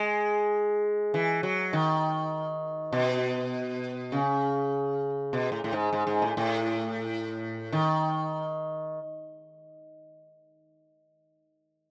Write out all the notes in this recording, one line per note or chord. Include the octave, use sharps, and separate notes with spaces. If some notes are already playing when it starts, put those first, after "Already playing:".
Already playing: G#3
E3
F#3
D#3
B2
C#3
B2
A2
A2
G#2
G#2
G#2
A2
A2
D#3